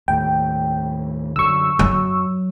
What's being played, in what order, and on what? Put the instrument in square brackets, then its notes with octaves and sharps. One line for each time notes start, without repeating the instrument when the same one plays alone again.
[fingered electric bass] D#2 A2 [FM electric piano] G5
[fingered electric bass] F#2 D3 [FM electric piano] C#6 E6
[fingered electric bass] F#2 [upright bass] F#3